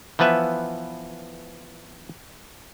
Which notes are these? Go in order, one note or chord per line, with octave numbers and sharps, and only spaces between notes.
E3 F3 B3 B4 E5